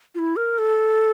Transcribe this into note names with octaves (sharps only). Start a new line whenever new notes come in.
F4
E4
A#4
A4